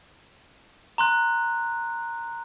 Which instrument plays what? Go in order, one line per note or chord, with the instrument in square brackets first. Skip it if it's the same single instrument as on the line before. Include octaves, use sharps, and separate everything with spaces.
[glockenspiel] A#5 C6 F#6